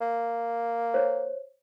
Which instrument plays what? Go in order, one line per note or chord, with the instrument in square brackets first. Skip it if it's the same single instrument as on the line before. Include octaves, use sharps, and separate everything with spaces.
[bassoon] A#3
[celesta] C5 C#5